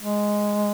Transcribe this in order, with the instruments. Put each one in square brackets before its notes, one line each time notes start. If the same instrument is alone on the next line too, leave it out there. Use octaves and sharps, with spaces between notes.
[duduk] G#3